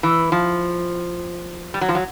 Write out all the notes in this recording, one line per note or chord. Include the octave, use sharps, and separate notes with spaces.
E3
F3
G3
F#3
F3
F#3